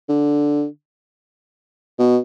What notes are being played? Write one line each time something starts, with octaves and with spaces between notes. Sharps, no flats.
D3
B2